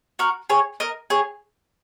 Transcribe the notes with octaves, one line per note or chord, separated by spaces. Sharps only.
F#4 A#4
G#4 C#5
A#4 D#5
G#4 C#5